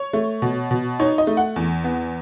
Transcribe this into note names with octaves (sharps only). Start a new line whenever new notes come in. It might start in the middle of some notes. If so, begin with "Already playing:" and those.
Already playing: C#5
A3
B2
B2
D#4 C#5
D#5
A3
F#5
E2
B3